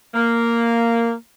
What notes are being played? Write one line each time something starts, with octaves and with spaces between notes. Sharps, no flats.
A#3